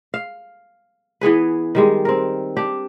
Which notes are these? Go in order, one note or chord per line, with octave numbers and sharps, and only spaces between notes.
F5
E3 B3 G#4 B4
D#3 G3 G#3
C4 A#4
D4 G4